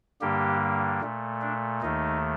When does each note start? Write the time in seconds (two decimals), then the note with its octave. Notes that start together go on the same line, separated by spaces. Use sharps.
0.21 G2 D3 G3 A#3 G4
1.01 A#2 A3
1.42 D4
1.82 D#2 D#3 A3 D#4